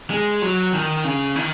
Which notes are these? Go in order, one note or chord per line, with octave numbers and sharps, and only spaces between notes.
G#3
F#3
D#3
C#3
D#3